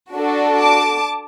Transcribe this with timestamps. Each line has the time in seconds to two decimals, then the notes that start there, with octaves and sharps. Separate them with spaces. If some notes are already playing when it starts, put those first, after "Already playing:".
0.13 D4 F#4 A4
0.60 A5 D6